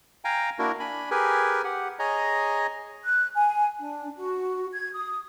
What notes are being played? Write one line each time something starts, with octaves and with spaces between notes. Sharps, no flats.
F5 G5 G#5 A#5
A#3 D4 E4 F#4 A#4
D4 G#5 B5
G4 G#4 A#4 B4 G#5
G4 F#5
G#4 C#5 D#5 G#5 A#5
F#6
G#5
D4
F#4
G#6
D#6